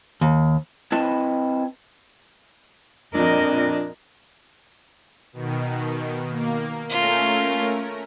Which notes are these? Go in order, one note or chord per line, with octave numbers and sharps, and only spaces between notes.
D#2
C4 E4 B4 D#5 A5
A#1 F2 D4 A#4 D#5
B2 D#3
A#3
A3 C#4 F4 A#4